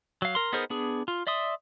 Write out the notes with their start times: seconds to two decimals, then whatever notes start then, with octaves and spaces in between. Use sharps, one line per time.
0.22 F#3 F5
0.35 A#4 C6
0.53 B3 D#4 G#4 A#4 C5
0.70 B3 D4 G#4
1.08 F4
1.27 D5 E5 C6 D#6